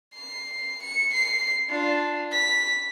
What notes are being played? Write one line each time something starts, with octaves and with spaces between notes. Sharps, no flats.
C7
C#7
C7
D4 F4
B6